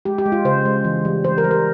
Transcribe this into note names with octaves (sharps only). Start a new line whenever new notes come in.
G#3 G4
G4
G#3
F4
C#3 C5
G#3
E3
G3
G3 C5
A#4
G3
A#4